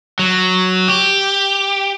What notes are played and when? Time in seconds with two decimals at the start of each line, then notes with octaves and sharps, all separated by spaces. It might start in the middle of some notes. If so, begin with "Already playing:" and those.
0.19 F#3
0.88 G4